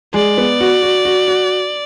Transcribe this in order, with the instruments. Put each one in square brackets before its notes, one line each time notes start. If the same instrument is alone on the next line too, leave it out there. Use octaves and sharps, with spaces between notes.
[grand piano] G#3 [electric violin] D5
[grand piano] B3
F#4
F#4
F#4
F#4